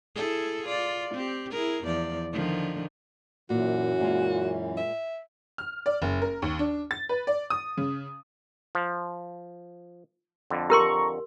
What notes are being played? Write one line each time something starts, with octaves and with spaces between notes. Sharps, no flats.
E4 G#4 A4
F4 D5
C4 G4
E4 G#4 A#4
E2 F3 D5
D3 D#3 F3
F#2 A#2 E3 F#4
A#2 G#3 F4
E5
F6
D5
F#1
A#4
D#2
D4
A6
B4
D5
D#6
C#3
F3
F2 D3
G4 A#4 A#5 C6 C#6